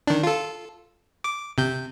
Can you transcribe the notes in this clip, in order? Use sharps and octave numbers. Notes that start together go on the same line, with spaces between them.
D#3 D4
F4 A4
D6
C3 G6